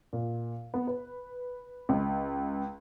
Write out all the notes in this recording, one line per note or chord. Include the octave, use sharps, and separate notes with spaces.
A#2
B3
B4
C#2